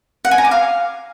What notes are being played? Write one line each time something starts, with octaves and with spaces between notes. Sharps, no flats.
F#5
G#5
A#5
D6
F5